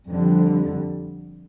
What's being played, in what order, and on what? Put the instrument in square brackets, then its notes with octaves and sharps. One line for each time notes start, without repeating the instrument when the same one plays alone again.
[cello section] F2 D3 G3